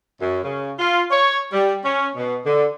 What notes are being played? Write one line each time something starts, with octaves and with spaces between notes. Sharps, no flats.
F#2
C#3
F4
C#5
G3
C#4
B2
D3